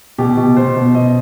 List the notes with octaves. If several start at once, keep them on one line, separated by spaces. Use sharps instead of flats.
B2 G4
B2
B2 C5
B2
B2 D#5